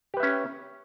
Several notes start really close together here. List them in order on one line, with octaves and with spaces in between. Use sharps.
G4 B4 E5 C#4